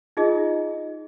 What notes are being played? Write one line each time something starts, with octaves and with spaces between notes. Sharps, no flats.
D#4 F4 G#4 D#5